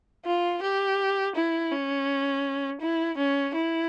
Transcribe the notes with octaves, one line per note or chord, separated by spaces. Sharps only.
F4
G4
E4
C#4
E4
C#4
E4